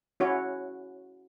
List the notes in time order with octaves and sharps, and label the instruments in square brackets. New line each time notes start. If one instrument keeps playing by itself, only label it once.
[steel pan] C#4 E4 F#4 C#5